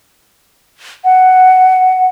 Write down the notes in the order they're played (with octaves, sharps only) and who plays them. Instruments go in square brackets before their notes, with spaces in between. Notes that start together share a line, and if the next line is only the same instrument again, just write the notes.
[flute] F#5